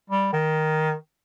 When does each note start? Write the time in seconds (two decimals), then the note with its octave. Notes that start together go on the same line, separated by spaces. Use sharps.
0.10 G3
0.33 D#3